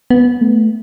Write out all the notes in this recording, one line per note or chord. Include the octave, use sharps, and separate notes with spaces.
B3
A3